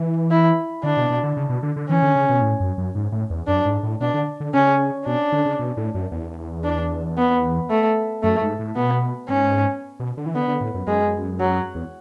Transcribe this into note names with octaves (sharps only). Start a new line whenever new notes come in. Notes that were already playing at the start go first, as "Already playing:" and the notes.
Already playing: E3
E4
D3 D4
B2
B2
D3
C#3
B2
D3
D3
E3 C#4
D3
C#3
B2
A2
F#2
F#2
G#2
A2
E2
F#2 D4
G#2
A2
B2 D4
D3
D3
C#3 C#4
B2 D4
D3
C#3
B2
A2
F#2
E2
D4
B3
A3
F#2 A3
G#2
A2
B2 B3
G#2 C#4
B2
D3
E3
D3 B3
D3
A2
F#2
F#2 G#3
F#3
E2